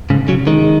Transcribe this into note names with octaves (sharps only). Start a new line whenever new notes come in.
G#2 C#3
C#3 F#3
D#3 G#3